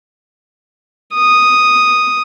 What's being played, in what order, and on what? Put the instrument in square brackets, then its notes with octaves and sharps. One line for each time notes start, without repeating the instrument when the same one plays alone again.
[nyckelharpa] D#6